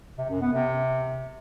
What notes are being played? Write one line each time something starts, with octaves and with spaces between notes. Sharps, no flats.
C3
F#2
B3
C3